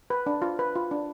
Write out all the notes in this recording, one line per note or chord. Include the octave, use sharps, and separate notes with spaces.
B4
D4
F4
B4
F4
D4